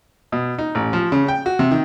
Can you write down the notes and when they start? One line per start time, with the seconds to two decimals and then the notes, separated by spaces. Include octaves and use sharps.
0.32 B2
0.58 D#4
0.75 A1
0.93 F3
1.12 C#3
1.28 G5
1.46 F#4
1.59 C3
1.72 D#3